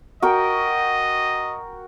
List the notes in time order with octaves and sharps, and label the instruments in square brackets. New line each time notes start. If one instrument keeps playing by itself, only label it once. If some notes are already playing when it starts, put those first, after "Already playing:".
[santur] F#4 A#4 G5 [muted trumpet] D#5